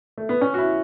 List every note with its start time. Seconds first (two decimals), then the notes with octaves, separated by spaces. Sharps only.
0.18 A3
0.29 B3
0.41 C#4
0.54 F#4
0.58 E4